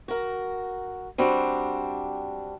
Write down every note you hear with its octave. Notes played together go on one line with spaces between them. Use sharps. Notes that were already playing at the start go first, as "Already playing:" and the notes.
F#4 A#4
G3 C4 D4 F#4